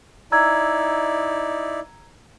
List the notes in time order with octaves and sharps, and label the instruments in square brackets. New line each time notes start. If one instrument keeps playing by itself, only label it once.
[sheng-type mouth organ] D#4 E4 D5 [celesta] A#5 E6 G#6